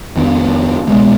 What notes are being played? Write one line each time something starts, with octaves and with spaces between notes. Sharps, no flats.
F2 D#3 B3 D4
C2 B2 G#3 B3